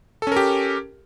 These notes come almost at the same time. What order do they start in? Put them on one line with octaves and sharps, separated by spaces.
A4 C#4 A#4 G4